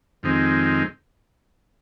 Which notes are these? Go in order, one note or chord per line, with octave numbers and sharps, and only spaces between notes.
F2 D#3 G#3 C4